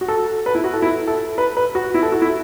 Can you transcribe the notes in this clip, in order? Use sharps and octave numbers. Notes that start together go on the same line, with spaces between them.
F#4
A4
B4
E4
F#4
A4
E4
A4
B4
B4
F#4
E4
A4
F#4
E4